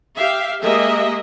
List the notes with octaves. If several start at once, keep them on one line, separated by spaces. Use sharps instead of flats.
G4 E5 F5
G#3 A#3 G4 D#5 E5